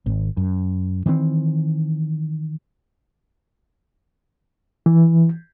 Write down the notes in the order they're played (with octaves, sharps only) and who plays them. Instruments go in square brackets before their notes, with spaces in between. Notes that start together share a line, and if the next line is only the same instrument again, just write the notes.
[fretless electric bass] G#1
F#2
D#3 E3 B3 C4
[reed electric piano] E3